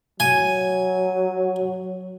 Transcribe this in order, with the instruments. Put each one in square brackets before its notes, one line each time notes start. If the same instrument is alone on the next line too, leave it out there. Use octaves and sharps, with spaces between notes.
[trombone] F#3 [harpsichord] G#5